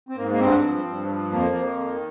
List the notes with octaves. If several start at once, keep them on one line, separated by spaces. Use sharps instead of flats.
C4
G#2 A#3
A#3
G2 C4
F3
G2
F3
F2 A#3
F2
D#3